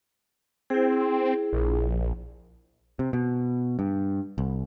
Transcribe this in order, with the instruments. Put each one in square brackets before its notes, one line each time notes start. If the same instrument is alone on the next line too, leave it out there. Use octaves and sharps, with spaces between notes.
[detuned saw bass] C4 [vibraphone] E4 G#4
[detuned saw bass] A#1
[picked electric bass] C3
B2
G2
C2